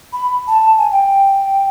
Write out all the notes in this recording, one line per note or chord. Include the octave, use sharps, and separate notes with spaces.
B5
A5
A5
G#5
G5